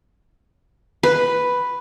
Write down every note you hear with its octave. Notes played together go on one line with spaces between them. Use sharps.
B4